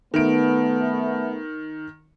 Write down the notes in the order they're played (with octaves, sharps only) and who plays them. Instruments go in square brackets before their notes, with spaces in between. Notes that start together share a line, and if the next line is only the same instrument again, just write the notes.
[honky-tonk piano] D#3 D7 [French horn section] A3 B3